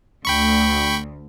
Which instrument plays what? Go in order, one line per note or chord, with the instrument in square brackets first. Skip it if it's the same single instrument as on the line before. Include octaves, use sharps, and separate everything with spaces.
[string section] D2 [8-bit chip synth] G5 B5 C#6